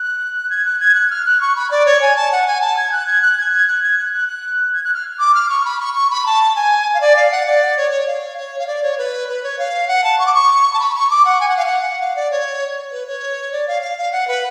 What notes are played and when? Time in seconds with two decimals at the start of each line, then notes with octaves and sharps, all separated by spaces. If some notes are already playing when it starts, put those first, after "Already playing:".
Already playing: F#6
0.50 G#6
0.65 F#6
0.80 G#6
0.95 F#6
1.10 F6
1.25 F#6
1.41 C#6
1.56 B5
1.71 D5
1.86 C#5
2.02 G#5
2.16 A5
2.32 F#5
2.47 G#5
2.61 A5
2.77 G#6
2.92 F#6
3.07 G#6
3.22 F#6
3.38 G#6
3.53 G#6
3.68 F#6
3.83 G#6
3.98 F#6
4.13 F#6
4.28 F#6
4.74 G#6
4.84 F#6
4.94 F6
5.19 D6
5.34 F6
5.49 C#6
5.65 B5
5.80 C#6
5.94 C#6
6.10 B5
6.26 A5
6.56 G#5
6.94 F5
7.01 D5
7.16 F5
7.31 F#5
7.46 D5
7.77 C#5
7.91 C#5
8.07 F5
8.37 C#5
8.59 F5
8.67 D5
8.83 C#5
8.98 B4
9.29 B4
9.43 C#5
9.59 F5
9.88 F#5
10.04 A5
10.19 C#6
10.26 D6
10.34 C#6
10.74 A5
10.79 B5
10.95 C#6
11.10 D6
11.25 F#5
11.40 G#5
11.49 F#5
11.57 F5
11.66 F#5
12.01 F5
12.16 D5
12.31 C#5
12.92 B4
13.07 C#5
13.52 D5
13.67 F5
13.82 F5
13.98 F5
14.12 F#5
14.28 B4